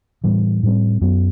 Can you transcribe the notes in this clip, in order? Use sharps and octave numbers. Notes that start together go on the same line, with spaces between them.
A2 E3 G3
A2 G3 C4
F#2 F#3 B3